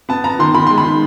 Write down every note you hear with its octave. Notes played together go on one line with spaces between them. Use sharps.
B3 A5
B3 A#5
D#3 C6
D#3 B5
G#3 C6
B5
D#3